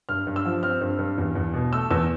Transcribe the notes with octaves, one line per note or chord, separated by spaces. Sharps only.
G2 F6
G2
E6
F3
C4 F6
G2
G2
E2
E2
B2
A3 E6
E2 E6